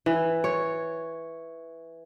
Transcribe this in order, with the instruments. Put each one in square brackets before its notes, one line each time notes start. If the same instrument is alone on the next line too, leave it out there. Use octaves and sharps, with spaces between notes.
[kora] E3
C#5